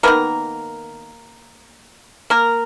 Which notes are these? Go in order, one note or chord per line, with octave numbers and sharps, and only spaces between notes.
D#3 G#3 A#3 B3 A#4
A#3 A#4